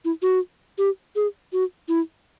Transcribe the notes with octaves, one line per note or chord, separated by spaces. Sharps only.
E4
F#4
G4
G#4
F#4
E4